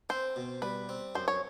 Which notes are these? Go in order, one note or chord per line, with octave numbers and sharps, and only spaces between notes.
C4 C5
B2
G3 B4
C4
F#2 C5
C#5